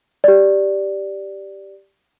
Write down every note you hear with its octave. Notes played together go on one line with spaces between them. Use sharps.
G4 D5